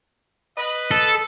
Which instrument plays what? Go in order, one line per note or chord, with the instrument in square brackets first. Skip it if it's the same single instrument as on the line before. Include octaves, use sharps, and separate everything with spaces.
[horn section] B4 D#5
[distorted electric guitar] A4